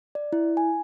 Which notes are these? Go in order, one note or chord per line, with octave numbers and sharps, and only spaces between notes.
D5
E4
G#5